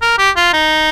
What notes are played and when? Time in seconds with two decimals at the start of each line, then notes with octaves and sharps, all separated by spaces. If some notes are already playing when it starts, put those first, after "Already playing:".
0.02 A#4
0.18 G4
0.37 F4
0.53 D#4